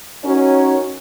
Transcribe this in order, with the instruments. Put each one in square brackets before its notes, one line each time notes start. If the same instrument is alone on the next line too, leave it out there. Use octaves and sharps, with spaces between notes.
[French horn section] C#4 D#4 F#4 A#4 C#5